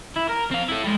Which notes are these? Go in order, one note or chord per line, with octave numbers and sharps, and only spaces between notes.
E4
A#4
C4 F5
E4 A4
G3 G#3